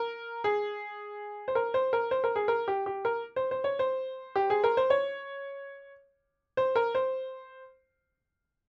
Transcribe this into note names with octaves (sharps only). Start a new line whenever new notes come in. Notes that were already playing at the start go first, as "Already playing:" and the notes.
Already playing: A#4
G#4
C5
A#4
C5
A#4
C5
A#4
G#4
A#4
G4
G4
A#4
C5
C5
C#5
C5
G4
G#4
A#4
C5
C#5
C5
A#4
C5